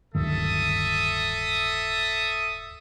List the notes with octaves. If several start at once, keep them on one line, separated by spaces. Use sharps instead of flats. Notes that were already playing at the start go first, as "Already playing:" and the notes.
D1 G2 D#3 A4 E5 D#6